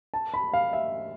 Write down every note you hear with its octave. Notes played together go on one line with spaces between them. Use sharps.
A5
B5
F5
E5